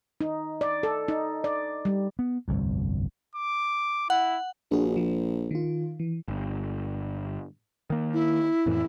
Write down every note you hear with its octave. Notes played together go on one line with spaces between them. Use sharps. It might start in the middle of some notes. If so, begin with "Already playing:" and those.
D#4
D5
A4
D#4
D5
G3
B3
G1 C2 F2
D6
E4 F#5
A#1 D4 F#4 G#4
F3
D#3 F4
E3
G1
D#3 A#3
E4
F2 A2 E3